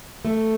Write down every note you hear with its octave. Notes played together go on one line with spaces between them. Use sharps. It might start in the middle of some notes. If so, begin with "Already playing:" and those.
A3